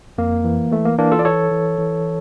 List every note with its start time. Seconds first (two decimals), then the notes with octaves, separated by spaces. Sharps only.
0.18 F2 A#3
0.44 E3
0.71 E3 A3
0.85 A#3
0.99 E3 A#3 D4
1.12 F4 A4
1.19 D5
1.25 E3 A4 C#5
1.51 E3
1.78 E3